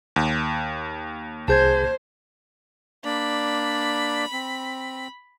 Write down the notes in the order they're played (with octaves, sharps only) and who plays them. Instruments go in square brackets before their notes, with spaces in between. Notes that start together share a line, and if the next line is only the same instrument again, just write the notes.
[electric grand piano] D#2
[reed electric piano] C2 G#4 [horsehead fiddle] C5 [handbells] A5 G6 G#6
[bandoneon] A#3 D4 D5 [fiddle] B5
[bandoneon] C4